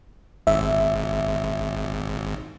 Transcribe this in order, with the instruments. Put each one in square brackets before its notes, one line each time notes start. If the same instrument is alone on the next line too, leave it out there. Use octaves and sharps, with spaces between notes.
[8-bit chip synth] G#1 [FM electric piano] E5